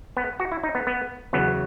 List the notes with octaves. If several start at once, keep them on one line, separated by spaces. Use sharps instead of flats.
B3
F#4
E4
D#4
B3
B3
E2 C#3 F#3 B3